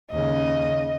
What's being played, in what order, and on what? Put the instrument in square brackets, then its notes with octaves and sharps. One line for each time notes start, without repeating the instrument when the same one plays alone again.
[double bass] D#2 C#3 [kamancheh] D#5